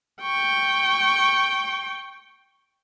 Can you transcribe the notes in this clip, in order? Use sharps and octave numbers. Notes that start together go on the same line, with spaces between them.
G5 C#6